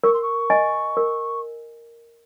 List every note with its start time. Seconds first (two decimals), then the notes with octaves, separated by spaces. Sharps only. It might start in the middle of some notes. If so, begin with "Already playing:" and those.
0.03 A#4 C#6
0.13 C6
0.22 C#6
0.50 D#5 G#5
0.97 A#4